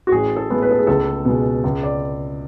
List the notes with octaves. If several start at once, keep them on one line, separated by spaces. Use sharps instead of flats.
F#4
A1 G#4
A4
A2 G#3 B3
B4
A4
G#4
C#2 A4
B2 G#3
C#2
D5